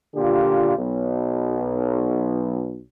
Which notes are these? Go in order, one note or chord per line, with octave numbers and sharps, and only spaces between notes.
A#2 D3 F4 G4
B1